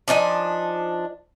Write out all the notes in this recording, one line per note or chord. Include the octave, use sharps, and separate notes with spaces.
F3 D4 D#4 G#5